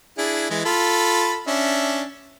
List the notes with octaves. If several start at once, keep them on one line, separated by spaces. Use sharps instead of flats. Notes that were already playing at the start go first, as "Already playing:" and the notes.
D4 E4 G#4
E3 G#3
F4 A4 B5
C#4 D4 E5